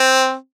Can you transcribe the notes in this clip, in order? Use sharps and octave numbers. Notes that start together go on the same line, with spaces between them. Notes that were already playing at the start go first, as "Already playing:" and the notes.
Already playing: C4